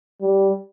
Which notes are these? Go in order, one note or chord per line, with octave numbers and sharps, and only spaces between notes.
G3